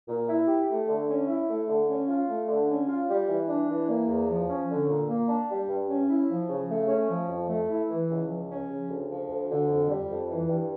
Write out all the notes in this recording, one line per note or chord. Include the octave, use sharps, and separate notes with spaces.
A#2
E4
G4
A3
D3
C#4
E4
A3
D3
C#4
F4
A3
D3
C#4
F4
G3
E3
D4
E3
A#3
E2
F3
C#4
D3
A#2
A#3
D4
G3
G2
C#4
E4
F3
C#3
A3
C#4
F3
F2
A3
E4
E3
C#2
F3
C#4
C#3
D2
F3
D2
D3
F2
G3
F2
E3
G2